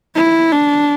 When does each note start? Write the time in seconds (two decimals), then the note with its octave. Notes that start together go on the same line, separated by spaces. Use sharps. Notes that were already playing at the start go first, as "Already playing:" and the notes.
0.15 E4
0.52 D4